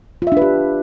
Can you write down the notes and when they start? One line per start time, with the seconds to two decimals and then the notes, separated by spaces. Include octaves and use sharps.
0.22 F4
0.27 E5
0.32 D4
0.37 B4
0.42 G4